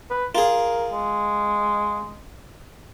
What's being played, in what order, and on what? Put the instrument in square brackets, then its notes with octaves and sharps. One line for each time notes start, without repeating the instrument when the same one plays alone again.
[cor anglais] B4
[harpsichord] F4 G#4 [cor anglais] A#4
[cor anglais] G#3